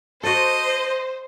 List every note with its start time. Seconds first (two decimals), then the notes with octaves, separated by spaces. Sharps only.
0.23 F#4 A4 C5 D#5